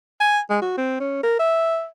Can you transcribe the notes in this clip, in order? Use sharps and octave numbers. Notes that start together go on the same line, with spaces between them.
G#5
G#3
F#4
C4
C#4
A#4
E5